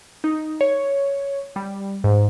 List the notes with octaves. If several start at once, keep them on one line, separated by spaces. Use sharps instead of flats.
D#4
C#5
G3
G#2